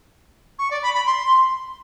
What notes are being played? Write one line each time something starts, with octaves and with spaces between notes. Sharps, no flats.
C#6
D5
B5
B5
C6